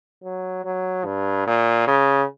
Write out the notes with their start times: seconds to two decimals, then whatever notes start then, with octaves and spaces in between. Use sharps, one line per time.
0.23 F#3
0.65 F#3
1.05 G2
1.47 A#2
1.87 C#3